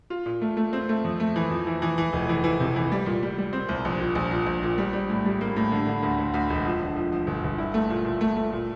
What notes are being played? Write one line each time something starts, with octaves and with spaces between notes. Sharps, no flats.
F4
A#2
A3
A3
C4
A3
F2
A3
E3
F2
E3
E3
E3
F1
E3
E3
C3
E3
G3
A#2
G3
G3
C4
C2
A#1
A#2
A#1
A#2
A#1
A#2
G3
G3
A2
G3
A#3
A2
D3
D3
D2
D2
D2
E1
F3
D3
F3
F3
G1
G1
E4
A3
A#2
A#2
A3
A3
A#2